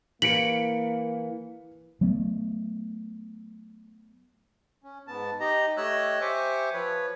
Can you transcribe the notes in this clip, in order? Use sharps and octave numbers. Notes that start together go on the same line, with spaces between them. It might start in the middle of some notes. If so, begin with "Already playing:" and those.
E3 A#3 B6 C#7 D7 F#7
F#3 A3 B3
C#4
G#2 B3 A5
D#4 G4 D#5 A#5
A3 G4 C#5 D#5 E6 F#6
G4 C5 E5 G#5 C#6 D6
F3 B4 C#5